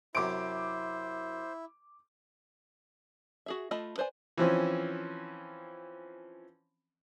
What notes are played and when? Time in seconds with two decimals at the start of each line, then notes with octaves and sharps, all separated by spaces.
0.15 F#2 C3 E4 C5 D6 D7
3.46 F#4 G#4 E5
3.71 A3 F4 D#5 A5 B5
3.98 B4 C5 D5 G#5
4.38 E3 F3 C4 C#4